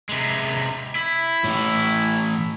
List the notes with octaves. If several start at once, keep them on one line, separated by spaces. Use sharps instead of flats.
C3 G#3
E4
A2 E3